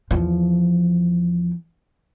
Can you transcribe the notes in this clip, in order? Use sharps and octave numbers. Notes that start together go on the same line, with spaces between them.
E2 F3